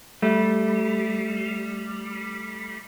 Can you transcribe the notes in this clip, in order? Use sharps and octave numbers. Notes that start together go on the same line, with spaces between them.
G3 A3